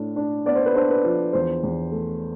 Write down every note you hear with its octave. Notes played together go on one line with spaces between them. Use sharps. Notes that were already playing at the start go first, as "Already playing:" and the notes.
Already playing: A2 D4
D4
B3 D5
C5
B4
D4 C5
B4
F3
E2 C5
E2
A3